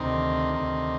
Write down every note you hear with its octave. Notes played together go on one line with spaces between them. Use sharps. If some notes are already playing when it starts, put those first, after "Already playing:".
Already playing: D2 C3 D#3 C4 D#4
D2 C3 D#3